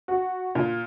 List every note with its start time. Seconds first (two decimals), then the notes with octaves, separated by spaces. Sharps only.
0.08 F#4
0.55 A#2